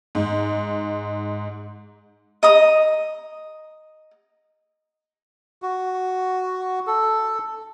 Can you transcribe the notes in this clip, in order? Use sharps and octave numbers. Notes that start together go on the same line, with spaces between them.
G#2
D#5 A#5 D#6
F#4
A4